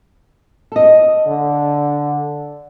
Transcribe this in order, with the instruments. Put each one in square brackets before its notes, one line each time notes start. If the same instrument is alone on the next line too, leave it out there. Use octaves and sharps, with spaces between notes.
[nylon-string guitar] A4 D#5
[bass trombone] D3